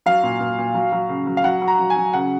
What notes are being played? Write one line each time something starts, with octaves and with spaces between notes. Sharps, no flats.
F#3 F5
A#2
A#2
A#2
F#3
F#3
C#3
F#3
F5
F#3 F#5
F#3
A#5
F#3
G#5
F#3
C#3 F#5